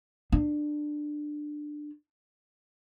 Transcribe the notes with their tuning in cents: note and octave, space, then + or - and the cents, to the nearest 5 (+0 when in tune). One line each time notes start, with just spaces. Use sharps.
D4 +15